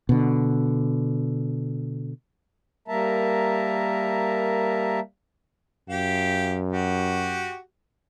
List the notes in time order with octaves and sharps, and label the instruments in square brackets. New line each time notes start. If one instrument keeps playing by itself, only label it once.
[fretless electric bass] B2 D3
[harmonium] G3 A#3 A#4 E5 A5 A#5
[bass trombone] F#2 [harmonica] G4 F5
[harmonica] F#4 G4